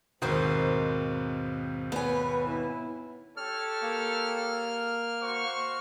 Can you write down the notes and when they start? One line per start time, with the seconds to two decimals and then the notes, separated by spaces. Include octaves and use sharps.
0.22 D#2 G#2 B2 D#3 C4 C5
1.92 B3 B4 C#5 G#5
2.48 E4
3.37 G4 A4 C#5 F6
3.82 A#3
5.21 F#4 C5 C#6